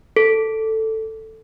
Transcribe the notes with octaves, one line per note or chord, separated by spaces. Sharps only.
A4